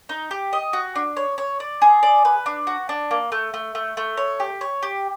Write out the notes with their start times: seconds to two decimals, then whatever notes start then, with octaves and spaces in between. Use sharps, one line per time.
0.09 D#4
0.31 G4
0.53 D#5
0.73 F#4
0.96 D4
1.17 C#5
1.38 C#5
1.60 D5
1.82 G#4
2.03 D5
2.25 B4
2.46 D4
2.67 F#4
2.89 D4
3.11 A#3
3.32 A3
3.54 A3
3.75 A3
3.97 A3
4.17 C#5
4.40 G4
4.61 C#5
4.83 G4